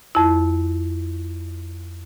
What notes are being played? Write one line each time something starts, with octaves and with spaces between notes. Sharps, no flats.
F2 E4